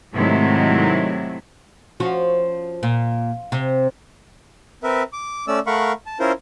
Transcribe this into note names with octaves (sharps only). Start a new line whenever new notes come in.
G#2 C3 D#3 F#3 A3 E4
F3 C#4 F#4
A#2
C3
C4 A#4 B4 E5
D6
A3 C#4 D5 E6
A3 A#4 F5 F#5 B5 C#6
A5
C#4 E4 F4 A#4 C5